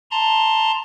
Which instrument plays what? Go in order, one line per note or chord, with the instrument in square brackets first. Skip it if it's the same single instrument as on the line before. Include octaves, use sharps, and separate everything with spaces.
[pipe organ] A5 A#5 C6